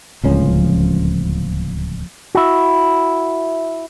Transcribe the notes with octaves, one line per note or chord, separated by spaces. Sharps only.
D1 C#2 F3 A#3 C#4
E4 F#4